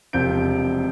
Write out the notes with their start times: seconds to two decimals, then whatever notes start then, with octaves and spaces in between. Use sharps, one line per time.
0.13 E1 C3 F3 G6 D7